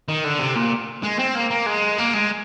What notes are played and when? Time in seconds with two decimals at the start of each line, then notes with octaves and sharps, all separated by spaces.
0.09 D#3
0.24 D3
0.40 C3
0.56 A#2
1.03 G#3
1.19 C4
1.35 A#3
1.50 A#3
1.66 G#3
1.98 A#3
2.14 G#3